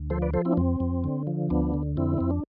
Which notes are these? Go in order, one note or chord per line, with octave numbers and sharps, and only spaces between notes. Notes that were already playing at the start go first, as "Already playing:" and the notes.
Already playing: D2
F3 A4 C5
B4 D5
F3 A4 C5
C4 E4
D4
F2 C4
F2
D3
F3
D2 B3 D4
D3
F2 C4 E4
F2 C4
D4